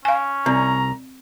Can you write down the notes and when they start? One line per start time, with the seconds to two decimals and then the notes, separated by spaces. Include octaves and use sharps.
0.05 C#4 F5 G#5
0.46 C2 C4 A#5